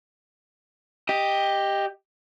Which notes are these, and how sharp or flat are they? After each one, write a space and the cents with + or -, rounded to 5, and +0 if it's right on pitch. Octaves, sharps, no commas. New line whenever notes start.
G4 +10 D#5 +5